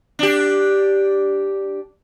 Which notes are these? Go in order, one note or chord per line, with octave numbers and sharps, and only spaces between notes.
D4 G4